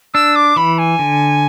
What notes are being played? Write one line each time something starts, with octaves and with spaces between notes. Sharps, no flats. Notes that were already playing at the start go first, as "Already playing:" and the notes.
D4 E6
D6
E3 B5
G#5
D3